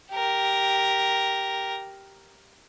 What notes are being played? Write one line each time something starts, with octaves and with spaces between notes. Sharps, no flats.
G4 A#4